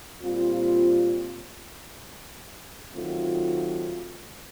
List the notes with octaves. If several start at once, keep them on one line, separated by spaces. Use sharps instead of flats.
A#2 G3 C4 F4
D#3 F#3 A3 C4 F4